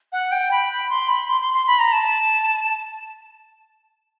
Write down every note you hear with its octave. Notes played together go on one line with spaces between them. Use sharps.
F#5
G5
B5
C6
B5
C6
C6
C6
B5
A#5
A5